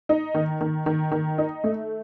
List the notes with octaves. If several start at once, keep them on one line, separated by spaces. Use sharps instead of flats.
D#4
D#3
D#3
D#3
D#3
D#4
A3